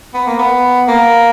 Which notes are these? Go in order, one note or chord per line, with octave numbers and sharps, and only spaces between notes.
B3
A#3
B3
A#3